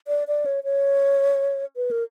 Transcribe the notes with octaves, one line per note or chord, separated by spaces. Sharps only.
D5
D5
C#5
C#5
B4
A#4